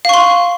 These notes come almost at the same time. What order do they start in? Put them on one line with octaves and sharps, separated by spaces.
F5 C#6 C6